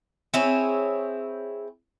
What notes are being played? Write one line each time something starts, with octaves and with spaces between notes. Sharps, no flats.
C4 E4 G#4 C#5